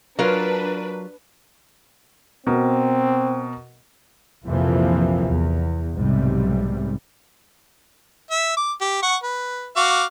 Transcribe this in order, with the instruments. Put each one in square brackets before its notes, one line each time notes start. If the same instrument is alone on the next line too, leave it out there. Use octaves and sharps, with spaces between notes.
[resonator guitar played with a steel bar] F#3 F4 A#4 [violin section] D4 B4
[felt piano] B2 A#4 [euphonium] C4
[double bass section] A#1 F2 C3 E3 F3 A#3
E2
B1 G#2 C3 G3
[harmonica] E5
D6
G4
F#5 C#6
B4
F#4 F5 D6